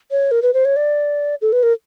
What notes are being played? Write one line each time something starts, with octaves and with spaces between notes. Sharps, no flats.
C#5
A#4
B4
C5
C#5
D5
A4
B4
A#4